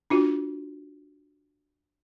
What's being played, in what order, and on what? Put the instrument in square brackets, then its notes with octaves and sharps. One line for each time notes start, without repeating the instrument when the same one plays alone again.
[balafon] D4 F4 F#4